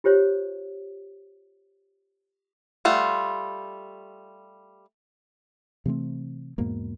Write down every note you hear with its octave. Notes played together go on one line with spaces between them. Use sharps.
F4 G4 C5 C#5
G3 A3 F4 F#5
C3 E3 A3 C4
E2 G#2 B2 A#3